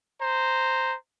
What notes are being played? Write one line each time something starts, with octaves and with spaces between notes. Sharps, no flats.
C5 A#5